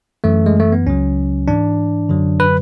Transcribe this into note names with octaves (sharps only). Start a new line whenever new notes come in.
F#2 E3 A3
G#3
A3
B3
C#2 C#3 F#3 C#4
G#2 E3 D4
F#2 D3 F#3
B4